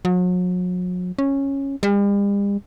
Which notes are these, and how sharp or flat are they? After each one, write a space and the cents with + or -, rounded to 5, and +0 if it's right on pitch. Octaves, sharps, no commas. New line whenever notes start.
F#3 -40
C#4 -10
G3 +45